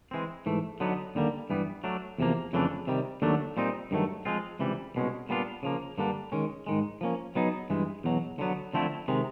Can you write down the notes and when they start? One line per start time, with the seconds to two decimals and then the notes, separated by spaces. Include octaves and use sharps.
0.11 E3 G#3 C4
0.46 G#2 E3 A3
0.80 D3 F#3 B3 D#4
1.15 D#2 D3 G3 A#3
1.50 G2 E3 G3 B3
1.84 F#3 A3 D4
2.18 E2 C3 F3 A#3
2.53 F2 C#3 E3 A3 D4
2.87 C3 D#3 G3
3.22 D#2 D3 F#3 A3 D4
3.57 A#2 G3 C4 D#4
3.91 G2 D#3 F#3 A3
4.25 F3 G#3 C4 F4
4.59 C#2 C3 E3 G3
4.95 C2 B2 G#3 C#4
5.29 A#2 G3 B3 D4 F4
5.63 C#3 F3 A#3
5.98 G2 D3 G3 A#3 D4
6.32 D#3 G#3 C#4
6.67 G#2 D#3 G#3
7.01 F3 A#3 C#4
7.35 F#3 B3 D#4 G#4
7.70 G2 E3 G#3
8.04 E2 B2 F#3
8.39 D3 F#3 B3
8.74 D3 F3 A3 C4 E4
9.08 C3 D#3 G#3